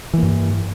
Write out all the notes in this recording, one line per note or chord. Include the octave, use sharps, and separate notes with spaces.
G2 E3 A#3